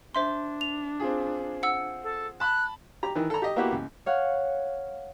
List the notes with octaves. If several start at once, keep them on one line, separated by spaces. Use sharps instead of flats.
D4 C5 E5 C6
F7
C4 F4 G#4
F#5 E6
A4
A5 B5 F#6
G4 A#5
D#3 E3
A4 A#5
G4 D#5
A#3 B3 E4 F#4 G4
C#2
C#5 F5 F#5